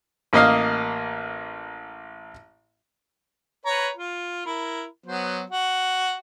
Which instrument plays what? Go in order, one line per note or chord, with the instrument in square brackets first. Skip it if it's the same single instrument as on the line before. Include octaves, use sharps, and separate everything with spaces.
[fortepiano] A1 A#3 D#5 F5
[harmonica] B4 C#5 A#5
F4
E4 A#4
F#3 B3 C5
F#4